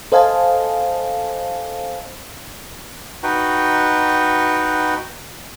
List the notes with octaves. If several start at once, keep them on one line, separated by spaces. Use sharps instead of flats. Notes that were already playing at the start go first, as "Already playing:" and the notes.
A4 C5 D#5 F5 G#5 A5
D#4 F#4 B4 G5